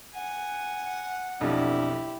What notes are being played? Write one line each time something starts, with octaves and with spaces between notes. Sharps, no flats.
F#5 G#5
B1 F2 D4 E4 G4